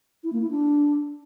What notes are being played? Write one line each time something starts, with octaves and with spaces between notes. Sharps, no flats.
E4
A#3
E4
D4